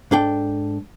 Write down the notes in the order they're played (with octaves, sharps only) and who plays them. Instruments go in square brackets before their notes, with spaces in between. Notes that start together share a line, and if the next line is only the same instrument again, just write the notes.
[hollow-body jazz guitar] G#2 D4 A4 G5